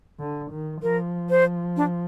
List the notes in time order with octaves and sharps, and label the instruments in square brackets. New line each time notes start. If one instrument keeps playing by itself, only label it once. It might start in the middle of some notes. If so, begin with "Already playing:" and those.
[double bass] D3
D#3
[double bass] F3 [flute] A#4
[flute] C5
D4